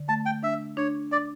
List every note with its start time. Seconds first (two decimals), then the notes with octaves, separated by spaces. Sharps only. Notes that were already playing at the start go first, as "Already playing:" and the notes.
Already playing: D3
0.09 A3 A5
0.26 G5
0.43 D4 E5
0.77 D4 C#5
1.12 D4 D5